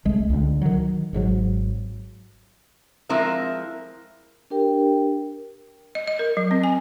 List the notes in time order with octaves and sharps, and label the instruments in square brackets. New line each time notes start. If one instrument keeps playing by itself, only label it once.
[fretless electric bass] C2 G#3 A3
C#2 D3
D#3 F#3
G#1 G#2 D3 F#3
[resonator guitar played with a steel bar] F3 G#3 C4 E4 A#4 E5
[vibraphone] D4 G4 A#4 G5
[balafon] D#5
D#5
A#4
F#3
C4
G#5